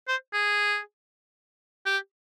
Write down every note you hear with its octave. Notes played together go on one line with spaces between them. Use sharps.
C5
G#4
G4